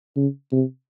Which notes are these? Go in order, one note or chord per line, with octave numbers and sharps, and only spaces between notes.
C#3
C3